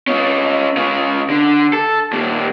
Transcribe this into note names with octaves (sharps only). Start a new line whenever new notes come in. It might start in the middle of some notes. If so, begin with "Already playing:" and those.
C#4 F4
C#3 F4
D3
A4
D#2 A#2